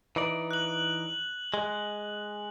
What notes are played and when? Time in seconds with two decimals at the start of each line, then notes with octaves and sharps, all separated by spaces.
0.16 E3 D#4 D5
0.51 F#6 F#7
1.54 G#3